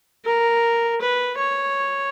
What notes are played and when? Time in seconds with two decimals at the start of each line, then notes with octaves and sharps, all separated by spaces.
0.25 A#4
1.01 B4
1.39 C#5